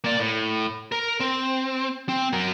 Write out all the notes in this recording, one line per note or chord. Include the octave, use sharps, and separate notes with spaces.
A#3 D5
A2
A#4
C4
C4
F#3 A#4